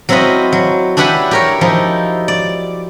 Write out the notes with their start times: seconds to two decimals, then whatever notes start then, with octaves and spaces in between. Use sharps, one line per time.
0.09 F#3 C4 E4 F4 B4 D#5
0.53 F#3
0.97 D4 E4 G4 B4 F#5 G#5
1.31 G4 A#4 C#5
1.61 F3 D#4 E4
2.28 D5